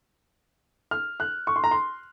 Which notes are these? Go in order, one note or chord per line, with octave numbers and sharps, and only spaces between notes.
F6
F#6
C#6
C6
A#5
C6